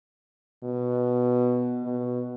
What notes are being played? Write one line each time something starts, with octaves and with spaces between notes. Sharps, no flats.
B2
B2